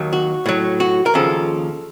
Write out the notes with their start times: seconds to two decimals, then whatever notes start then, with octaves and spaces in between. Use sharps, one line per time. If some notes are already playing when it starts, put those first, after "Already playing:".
Already playing: D#2 D#3 F#3
0.13 F#4
0.46 A2 F#3
0.80 F#4
1.06 A#4
1.14 D#2 C#3 F3 A4